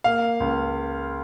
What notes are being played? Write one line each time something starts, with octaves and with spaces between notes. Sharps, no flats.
A#3 F5
C#2